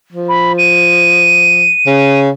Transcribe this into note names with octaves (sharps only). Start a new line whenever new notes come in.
F3
B5
D#7
C#3